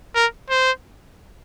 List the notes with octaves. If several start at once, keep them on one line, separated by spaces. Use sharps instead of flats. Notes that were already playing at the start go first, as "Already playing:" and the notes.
A#4
C5